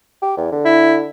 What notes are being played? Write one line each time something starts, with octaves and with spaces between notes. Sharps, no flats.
G4
E2
D3
E4